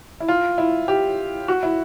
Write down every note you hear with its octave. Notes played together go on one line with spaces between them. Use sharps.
E4
F4
E4
G4
F#4
E4